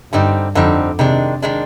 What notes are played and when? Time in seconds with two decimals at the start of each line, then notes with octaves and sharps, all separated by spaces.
0.12 G2 D3 G3 C4 D#4
0.55 F2 D3 G3 C4 D#4
0.99 C3 D#3 G#3 D4
1.42 D#3 G#3 D4